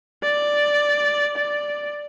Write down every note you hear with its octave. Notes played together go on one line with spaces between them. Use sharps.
D5
D5